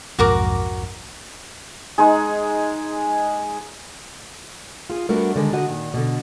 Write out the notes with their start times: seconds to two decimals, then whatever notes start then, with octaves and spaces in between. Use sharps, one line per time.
0.19 B1 F2 G#2 F#4 A#4 D6
1.98 G#3 D#4 G#4
4.90 F4 G#4
5.09 G3 A3 B3 D4 F#4 A#4
5.36 D3 D#3 G3 G#3
5.53 D3 F#4 D#5
5.68 A#2 D#3
5.94 B2 D3